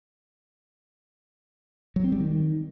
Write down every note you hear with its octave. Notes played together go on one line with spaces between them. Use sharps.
F#3
C4
G3
D#3